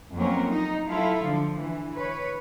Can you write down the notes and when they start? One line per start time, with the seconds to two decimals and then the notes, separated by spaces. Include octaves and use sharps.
0.15 F2 F#3 A#3 C4 C#4 A#4
0.48 D#4
0.86 F#3 E4 F4 A4 F5
1.23 D3 F3
1.57 E3
1.94 B4 C#5